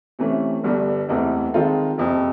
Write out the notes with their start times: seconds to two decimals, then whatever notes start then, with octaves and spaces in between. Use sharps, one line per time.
0.19 C3 E3 A3 C#4
0.64 G1 G2 D3 G3 B3
1.09 F#1 E2 C3 E3 A3
1.54 D#3 G#3 C4 F4 A4
1.98 F#1 F2 C3